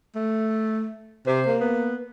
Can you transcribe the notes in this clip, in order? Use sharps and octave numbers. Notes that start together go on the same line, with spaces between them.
A3
C3 C5
A#3
B3